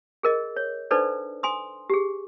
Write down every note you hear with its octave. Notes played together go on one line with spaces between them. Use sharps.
G#4 A#4 D#5
C#5
D4 D#4 A4 B4 C5 D5
G#5 C6 D#6
G4 G#4